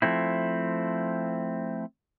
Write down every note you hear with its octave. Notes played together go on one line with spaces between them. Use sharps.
F3 A3 C4 E4